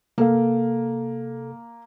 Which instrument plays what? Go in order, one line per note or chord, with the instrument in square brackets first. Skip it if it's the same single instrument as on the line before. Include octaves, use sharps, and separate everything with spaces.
[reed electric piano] C3 A4 F5 [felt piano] A#3